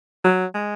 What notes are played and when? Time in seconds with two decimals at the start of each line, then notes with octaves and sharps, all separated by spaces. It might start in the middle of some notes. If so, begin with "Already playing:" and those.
0.24 F#3
0.55 G#3